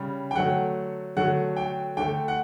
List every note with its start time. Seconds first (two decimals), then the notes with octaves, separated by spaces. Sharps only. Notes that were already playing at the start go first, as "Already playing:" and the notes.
Already playing: C#3 G3
0.31 G5
0.35 D3 F#3 A3 F#5
1.16 D3 F#3 A3 F#5
1.57 G5
1.97 D3 A3 G5
2.28 F#5